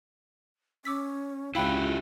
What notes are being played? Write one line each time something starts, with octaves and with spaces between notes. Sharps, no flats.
C#4 D6 E6 B6
C#2 E4 F#4 G4 E5 F5 G5 B5